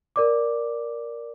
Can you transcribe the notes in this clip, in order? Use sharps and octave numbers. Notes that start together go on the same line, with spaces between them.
A#4 D5 D6